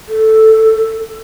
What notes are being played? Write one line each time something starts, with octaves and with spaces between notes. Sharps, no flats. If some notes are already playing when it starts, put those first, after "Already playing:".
A4